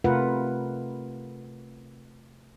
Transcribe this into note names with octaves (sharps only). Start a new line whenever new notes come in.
C3 A3 F4 A#4 B4 F#5